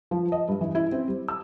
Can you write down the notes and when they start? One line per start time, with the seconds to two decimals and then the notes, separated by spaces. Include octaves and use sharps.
0.11 F3
0.32 D#5
0.48 G2
0.61 E3
0.75 E4
0.92 C4
1.08 G3
1.28 E6